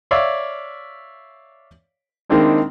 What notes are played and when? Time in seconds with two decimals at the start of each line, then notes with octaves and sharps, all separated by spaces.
0.11 C#5 D5 E5 F5
2.29 D#3 G#3 A#3 C4 D4 E4